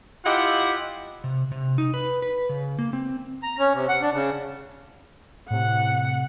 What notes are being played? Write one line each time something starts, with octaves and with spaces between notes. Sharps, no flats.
E4 F4 G4 D#5 F#5
C3
C3
D#4
B4
B4
C#3
A#3
C4
A#5
C#4
C3
F#5
D4
C#3
A2 C3 F#5